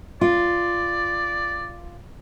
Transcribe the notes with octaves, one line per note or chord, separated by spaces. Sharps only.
F4 D5